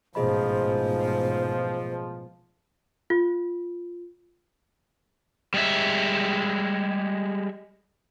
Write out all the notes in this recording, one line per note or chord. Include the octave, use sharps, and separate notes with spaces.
A1 G#2 B2 F3 G#4 C5 D#5 B5
F4
G3 G#3 E5